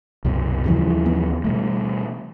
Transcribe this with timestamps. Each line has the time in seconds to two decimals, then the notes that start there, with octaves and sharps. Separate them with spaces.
0.25 C2 F#2 B2
0.66 D#2 C#3 E3 F3 G3
1.06 B3
1.44 B2 G3 A3